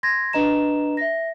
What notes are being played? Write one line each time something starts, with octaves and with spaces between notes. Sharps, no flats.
C6 G#6 A#6
D4 B4 D#5 A#5 E7
E5 A#6